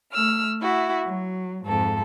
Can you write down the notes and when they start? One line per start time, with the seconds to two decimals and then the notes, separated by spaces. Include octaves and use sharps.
0.13 A3 E6 F6
0.62 E4 F#4 E5
1.05 F#3
1.63 F2 G#2 A4